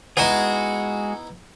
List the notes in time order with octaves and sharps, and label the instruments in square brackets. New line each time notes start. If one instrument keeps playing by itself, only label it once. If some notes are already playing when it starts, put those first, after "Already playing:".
[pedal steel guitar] G#3 F#4 G#4 [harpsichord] B3 D#4 E4